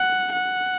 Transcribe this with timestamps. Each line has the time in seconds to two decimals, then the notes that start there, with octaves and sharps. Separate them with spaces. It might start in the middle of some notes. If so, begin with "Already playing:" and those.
Already playing: F#5
0.32 F#5